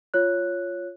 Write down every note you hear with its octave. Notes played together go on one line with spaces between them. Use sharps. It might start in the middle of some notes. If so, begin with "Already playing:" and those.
F4 C#5 F#6